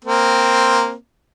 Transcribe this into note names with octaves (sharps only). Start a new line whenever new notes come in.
A#3 C4